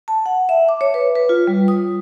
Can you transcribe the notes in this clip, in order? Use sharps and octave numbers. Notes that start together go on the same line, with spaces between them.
A5
F#5
E5
D6
C#5
B4
B4
F4
G3
D#6